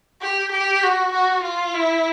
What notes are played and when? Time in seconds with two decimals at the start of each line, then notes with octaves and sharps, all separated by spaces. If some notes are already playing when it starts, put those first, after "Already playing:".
0.22 G4
0.52 G4
0.83 F#4
1.13 F#4
1.43 F4
1.74 E4